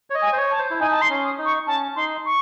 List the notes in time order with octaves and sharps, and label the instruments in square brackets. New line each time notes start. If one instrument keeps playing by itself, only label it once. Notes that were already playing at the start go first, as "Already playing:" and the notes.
[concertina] C#5
D#5
[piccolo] G#5
[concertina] C5
C#5
[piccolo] A5
[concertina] C5
E4
[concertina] D#4 [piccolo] G#5
[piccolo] A5
C6
[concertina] C#4
[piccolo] D#6
[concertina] D#4
[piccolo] C#6
[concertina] C#4 [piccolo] A5
[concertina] D#4 [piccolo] C6
[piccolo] C#6